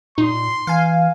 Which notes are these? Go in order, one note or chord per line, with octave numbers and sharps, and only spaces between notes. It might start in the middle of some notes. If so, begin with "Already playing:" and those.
A#2 D#4 C6
E3 F5 G#5